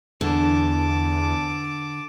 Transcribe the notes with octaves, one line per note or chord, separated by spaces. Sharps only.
E2 D3 A5 D6